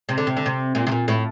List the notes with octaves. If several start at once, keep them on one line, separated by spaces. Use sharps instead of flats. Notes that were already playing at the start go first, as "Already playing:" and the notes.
C3
D3
C3
D3
C3
A#2
C3
A#2
A2